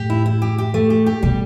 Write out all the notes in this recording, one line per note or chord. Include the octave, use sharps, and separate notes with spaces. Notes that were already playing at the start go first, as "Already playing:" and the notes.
Already playing: A2 G4
E4
E4
G4
G4
A3
G4
G4
B2 G3